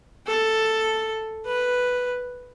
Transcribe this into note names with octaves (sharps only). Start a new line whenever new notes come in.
A4
B4